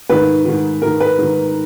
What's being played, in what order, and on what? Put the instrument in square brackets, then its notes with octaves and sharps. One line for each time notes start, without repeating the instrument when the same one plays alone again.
[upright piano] G#2 D#3 B4
G#2 D#3
G#2 D#3 A#4
B4
G#2 D#3